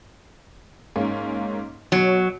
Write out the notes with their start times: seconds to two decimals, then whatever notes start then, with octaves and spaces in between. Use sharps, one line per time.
0.96 G#2 A#3 C#4
1.92 B2 F#3 C#5